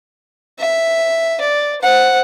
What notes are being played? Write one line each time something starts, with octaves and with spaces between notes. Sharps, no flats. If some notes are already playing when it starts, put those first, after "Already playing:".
E5
D5
C5 F#5